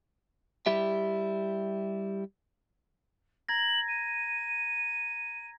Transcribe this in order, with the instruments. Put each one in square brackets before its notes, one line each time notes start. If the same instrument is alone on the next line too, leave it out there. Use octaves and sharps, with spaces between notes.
[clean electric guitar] G3 E4 G4 E5
[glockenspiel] A#5 G#6 A#6 [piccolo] F#7
[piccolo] D#7